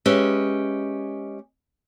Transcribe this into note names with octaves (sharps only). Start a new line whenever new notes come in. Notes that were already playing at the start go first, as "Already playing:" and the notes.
G#3 C#4 G4 B4 D#5 E5